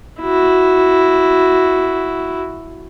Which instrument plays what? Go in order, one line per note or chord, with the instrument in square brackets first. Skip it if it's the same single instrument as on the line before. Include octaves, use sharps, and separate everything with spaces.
[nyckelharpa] E4 F#4